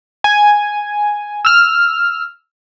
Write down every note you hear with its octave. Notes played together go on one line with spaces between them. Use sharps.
G#5
E6 F6